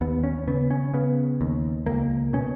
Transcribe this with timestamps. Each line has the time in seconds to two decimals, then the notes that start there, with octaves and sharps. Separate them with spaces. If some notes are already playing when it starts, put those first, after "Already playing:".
0.01 D#2 B3
0.24 C#4
0.48 C#3 B3
0.71 C#4
0.94 C#3 B3
1.41 D#2
1.86 C#2 A#3
2.33 B2 C#4